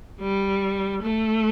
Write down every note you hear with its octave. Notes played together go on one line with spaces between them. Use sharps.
G3
A3